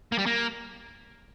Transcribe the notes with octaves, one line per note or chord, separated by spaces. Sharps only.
A#3
G3
A#3